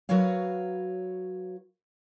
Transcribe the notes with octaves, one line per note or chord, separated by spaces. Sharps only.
F#3 F#4 A#4 B4 C#5 F5